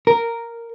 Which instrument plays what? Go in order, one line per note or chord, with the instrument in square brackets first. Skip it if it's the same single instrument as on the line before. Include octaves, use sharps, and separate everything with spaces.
[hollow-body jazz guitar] A#4